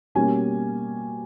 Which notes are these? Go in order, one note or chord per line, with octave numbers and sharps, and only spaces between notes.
B2 G3 A#3 C#4 G#5